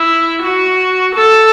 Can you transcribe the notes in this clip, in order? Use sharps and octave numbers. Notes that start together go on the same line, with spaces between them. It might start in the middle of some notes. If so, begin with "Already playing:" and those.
Already playing: E4
F#4
A4